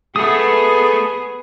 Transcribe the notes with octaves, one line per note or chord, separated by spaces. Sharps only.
A3 B3 G#4 A4 D#6